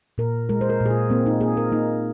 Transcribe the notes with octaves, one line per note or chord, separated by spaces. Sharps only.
A#2 A#4
G#3 A#4
C5
A#4
A#2
G#4
F4
A#3 C4
D#4
A#3 G#4
A#4
A#3 D#4